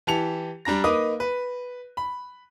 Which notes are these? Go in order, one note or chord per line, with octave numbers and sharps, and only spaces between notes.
E3 G4 A5 C#7 F7
G3 D4 A#5 A#6
A#3 D#4 B4 D6 D#6
B4
B5